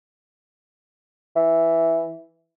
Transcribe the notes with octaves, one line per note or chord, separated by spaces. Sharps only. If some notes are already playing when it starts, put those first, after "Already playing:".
E3